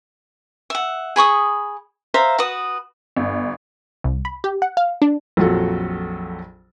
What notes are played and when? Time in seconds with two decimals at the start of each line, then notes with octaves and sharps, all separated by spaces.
0.70 E5 F#5
1.16 G#4 B5 C#6 D#6
2.14 C5 E5 F5 A#5
2.38 F#4 B4 D#6
3.17 G1
4.04 C2
4.25 B5
4.44 G4
4.62 F#5
4.77 F5
5.02 D4
5.37 A#1 F2 F#3 F4 F#4 A4